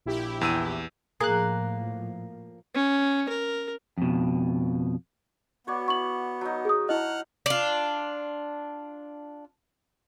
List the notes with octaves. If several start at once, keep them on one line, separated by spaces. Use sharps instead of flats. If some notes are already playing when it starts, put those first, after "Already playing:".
A#1 E4 G4
E2 E6 D#7
A2 F3 A#3 G#4 F#6
C#4
A#4
F2 B2
B3 F#4 C#5 D5
E4 C#6 F#7
F#3 D#4
G#4 D#6
E4 D#5 F#5 F6 F#6
D4 F4